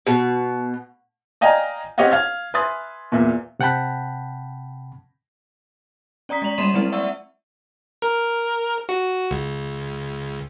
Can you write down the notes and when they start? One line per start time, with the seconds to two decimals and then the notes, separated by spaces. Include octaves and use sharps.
0.07 B2
1.41 D5 D#5 F5 G5 G#5 A#5
1.98 C4 G4 C#5 D#5 F5 F#5
2.11 F5 F6 G#6
2.54 B4 E5 G#5 C6 D#6 A6
3.12 E2 A#2 E5
3.59 C3 F#5 G5 A5 B5
6.29 C#4 D5 A#5 D#6 B6
6.42 G#3 D5 A#5 F7 F#7
6.58 G3 A#3 B5 C6 D#7 E7
6.74 F#3 G#3 C4 E4
6.92 D5 E5 F#5 C#6 E6
8.02 A#4
8.89 F#4
9.31 C#2